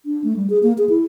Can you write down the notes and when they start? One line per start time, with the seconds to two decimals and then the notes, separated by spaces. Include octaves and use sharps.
0.06 D4
0.24 A3
0.36 G3
0.50 G#4
0.63 A#3
0.78 G#4
0.89 E4